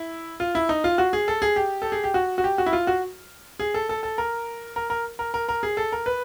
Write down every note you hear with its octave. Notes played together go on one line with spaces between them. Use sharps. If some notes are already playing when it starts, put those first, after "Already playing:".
Already playing: E4
F4
E4
D#4
F4
F#4
G#4
A4
G#4
G4
A4
G#4
G4
F#4
F#4
G4
F#4
E4
F4
F#4
G#4
A4
A4
A4
A#4
A#4
A#4
A#4
A#4
A#4
G#4
A4
A#4
B4